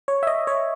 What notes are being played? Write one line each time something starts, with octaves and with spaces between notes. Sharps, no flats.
C#5
E5
D#5
C#5